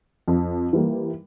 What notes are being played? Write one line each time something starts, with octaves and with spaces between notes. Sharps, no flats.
F2
E3 G3 A#3